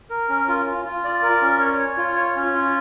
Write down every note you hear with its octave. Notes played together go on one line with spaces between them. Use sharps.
A#4
C#4
F4
F4
F4
D5
A#4
C#4
C#5
C#5
F4
C#5
C#4
F4